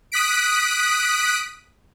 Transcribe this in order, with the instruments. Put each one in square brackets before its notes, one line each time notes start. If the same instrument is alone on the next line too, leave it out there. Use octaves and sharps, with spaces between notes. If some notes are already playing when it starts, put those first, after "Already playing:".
[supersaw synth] D#6 F#6 B6 D7